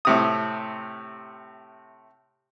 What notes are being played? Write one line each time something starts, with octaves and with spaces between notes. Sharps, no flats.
A2 C3 D#6